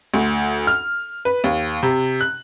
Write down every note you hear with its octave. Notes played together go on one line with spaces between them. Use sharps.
D2
F6
B4
D#2
C3
F#6